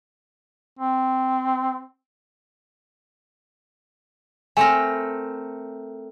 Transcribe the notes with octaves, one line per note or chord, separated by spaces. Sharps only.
C4
A3 C4 A#4 G#5